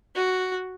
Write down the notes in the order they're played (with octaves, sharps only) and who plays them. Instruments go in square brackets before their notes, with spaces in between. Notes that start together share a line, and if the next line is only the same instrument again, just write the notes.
[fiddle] F#4